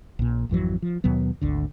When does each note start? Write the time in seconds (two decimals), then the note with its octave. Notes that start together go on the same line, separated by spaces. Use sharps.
0.19 A#1 A#2
0.49 G#1 F2 E3 F#3
0.82 F3
1.04 D#2 B2 F#3 B3
1.41 G#1 D2 D3